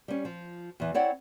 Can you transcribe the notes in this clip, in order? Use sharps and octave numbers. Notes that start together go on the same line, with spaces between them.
G3 C#4
F3
E2 E3
C4 E4 C#5 D5 F#5